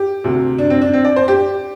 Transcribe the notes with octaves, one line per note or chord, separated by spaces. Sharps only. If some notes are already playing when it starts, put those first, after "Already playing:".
Already playing: G4
D2 C3
D4
C4
D4
C4
D5
C5
G4